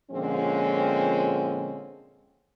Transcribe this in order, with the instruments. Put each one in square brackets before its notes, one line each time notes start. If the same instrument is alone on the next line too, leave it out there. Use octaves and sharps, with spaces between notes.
[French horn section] A#2 D3 F3 G#3 C4 C#4